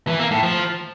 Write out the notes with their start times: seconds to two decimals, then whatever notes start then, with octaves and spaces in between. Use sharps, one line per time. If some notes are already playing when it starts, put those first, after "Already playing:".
0.07 E3
0.19 A#3
0.31 A2
0.43 F3